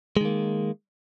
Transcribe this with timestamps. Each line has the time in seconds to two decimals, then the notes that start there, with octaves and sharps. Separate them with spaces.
0.17 G#3
0.21 D#3
0.25 A#3